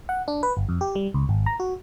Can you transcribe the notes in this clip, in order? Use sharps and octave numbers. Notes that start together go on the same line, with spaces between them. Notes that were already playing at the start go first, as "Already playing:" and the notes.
F#5
D4
B4
G1
F2
G4
G3
C#2
G#1
A#5
F#4